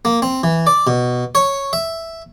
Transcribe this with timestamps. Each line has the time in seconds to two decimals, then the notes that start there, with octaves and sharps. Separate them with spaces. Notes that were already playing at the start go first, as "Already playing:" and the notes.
0.05 A#3
0.22 C4
0.43 E3
0.67 D5
0.87 B2
1.35 C#5
1.73 E5